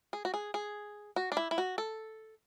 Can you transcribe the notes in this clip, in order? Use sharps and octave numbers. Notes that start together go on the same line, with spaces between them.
G#4
F#4
G#4
G#4
F#4
D4
E4
E4
F#4
A4